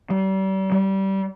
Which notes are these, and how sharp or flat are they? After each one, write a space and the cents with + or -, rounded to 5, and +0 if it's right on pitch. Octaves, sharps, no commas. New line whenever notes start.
G3 -35
G3 -20